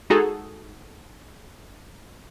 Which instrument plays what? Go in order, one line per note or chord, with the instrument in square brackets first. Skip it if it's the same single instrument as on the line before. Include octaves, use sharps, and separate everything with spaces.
[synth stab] G#3 D#4 F#4 G#4 A4